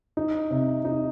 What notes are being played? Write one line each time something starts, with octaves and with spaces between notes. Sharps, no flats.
D#4
C3
D#4